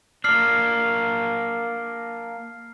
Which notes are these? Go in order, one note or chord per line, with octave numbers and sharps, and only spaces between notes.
A#3 D4 F6 C7